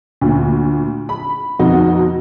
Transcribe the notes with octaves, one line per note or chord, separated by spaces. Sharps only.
D2 A#2
B5
F2 B2 D#4 F#4